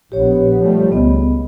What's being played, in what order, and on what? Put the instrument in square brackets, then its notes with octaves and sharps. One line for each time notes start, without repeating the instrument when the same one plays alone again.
[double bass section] A#1 B3 [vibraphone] G4 C#5
[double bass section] F3 G3 A3
[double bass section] C#2 [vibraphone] B3 D#5